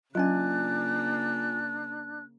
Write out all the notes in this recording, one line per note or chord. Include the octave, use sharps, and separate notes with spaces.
C#3 F#3 A#3 C#4 D4 F4 G#5 F#6